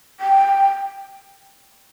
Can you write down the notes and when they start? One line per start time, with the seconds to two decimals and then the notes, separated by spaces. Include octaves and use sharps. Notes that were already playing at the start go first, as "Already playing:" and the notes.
0.20 G5